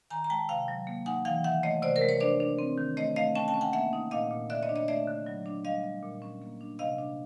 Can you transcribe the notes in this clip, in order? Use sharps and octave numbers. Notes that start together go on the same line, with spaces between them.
D#3 G#5 A#5
A#5
G#3 G5 A5
C3 F5 G5
F#3
A#3
D#4 F#5 G#5
E3 F5 G5
D#3 E5 F#5
A3 C#5 D#5
C3 C5 D5
A#4 C5
G#3
B4 C#5
D4 C5 D5
D4
C4
D#3
A3 C#5 D#5
A3 D#5 F5
C#4 G5 A5
G5 A5
C#4
F#5 G#5
A#3 E5 F#5
D#4
A#2 D#5 F5
A#2
D3 D5 E5
C#5 D#5
D4
C#5 D#5
A3 D5 E5
D3
F#3
D4
G3 D#5 F5
G3
A#2
C#4
A#3
D4
C3 D#5 F5
D4